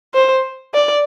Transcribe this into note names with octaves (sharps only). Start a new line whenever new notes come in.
C5
D5